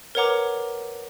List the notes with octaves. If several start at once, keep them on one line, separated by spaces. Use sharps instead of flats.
A#4 B4 C#5 F#5 A#5 D6